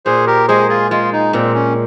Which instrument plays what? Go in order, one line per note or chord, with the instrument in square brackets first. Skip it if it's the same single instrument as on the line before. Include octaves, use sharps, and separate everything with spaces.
[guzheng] A#2 [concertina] G#4 C5
[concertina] G4 A#4
[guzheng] G#3 [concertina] G#4 C5
[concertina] F4 G#4
[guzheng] G#3 [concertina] F4
[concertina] D#4
[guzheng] A#2 [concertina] C4
[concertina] C#4